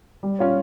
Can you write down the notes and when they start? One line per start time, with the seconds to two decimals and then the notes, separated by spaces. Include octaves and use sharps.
0.23 G3
0.39 C#4 F4 C#5